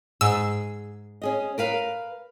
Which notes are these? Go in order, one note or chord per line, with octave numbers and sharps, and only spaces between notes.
G#2 G#4 E6
C#4 G#4 D#5
A#4 B4 F5